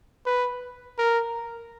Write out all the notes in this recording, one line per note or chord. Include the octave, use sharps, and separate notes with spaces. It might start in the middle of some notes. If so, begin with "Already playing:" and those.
B4
A#4